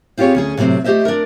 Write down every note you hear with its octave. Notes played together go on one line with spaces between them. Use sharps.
C4 F4 G4 G#4 C#5
D2 C#4 G#4
A2 C3 F#3 C4
A3 G4 C5 D#5 E5
D4 A#4